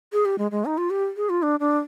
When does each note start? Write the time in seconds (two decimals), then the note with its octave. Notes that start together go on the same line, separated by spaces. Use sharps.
0.13 G#4
0.25 G4
0.38 G#3
0.51 G#3
0.65 D#4
0.78 F4
0.90 G4
1.17 G#4
1.29 F4
1.42 D4
1.60 D4